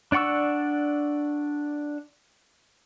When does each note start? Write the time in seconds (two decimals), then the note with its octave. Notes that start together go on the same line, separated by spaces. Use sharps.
0.12 D4 D5 F#5 C#6 E6